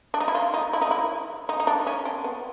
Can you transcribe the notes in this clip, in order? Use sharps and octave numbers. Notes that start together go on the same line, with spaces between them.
D4
D#4
E4
F4
D#4
E4
D#4
E4
D#4
D#4
D4
C#4
C4
B3